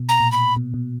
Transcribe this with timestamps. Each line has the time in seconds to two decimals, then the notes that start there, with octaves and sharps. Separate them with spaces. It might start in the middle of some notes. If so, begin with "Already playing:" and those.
Already playing: B2
0.09 A#5
0.20 A#2
0.32 B5
0.56 B2
0.74 B2